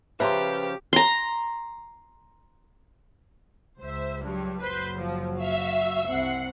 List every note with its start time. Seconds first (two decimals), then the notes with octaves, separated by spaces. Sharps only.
0.20 C#3 F3 G4 B4 E5 A#5 C6
0.93 A#5 C6
3.80 C#2 C5 E5
4.23 G2 F#3
4.62 F#1 F#3 B4 C5 G6
4.99 F3
5.38 F#4 E5 F5
6.07 C2 C4 F#5 C7